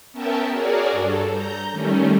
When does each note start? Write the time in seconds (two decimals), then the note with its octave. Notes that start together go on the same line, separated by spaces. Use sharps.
0.12 B3 C#4 A#4 E5 G5 A5
0.51 F#4 G#4 A#4 C#5 D5
0.91 G2 A4
1.29 A#5 G6
1.71 D#3 G3 A3 C#4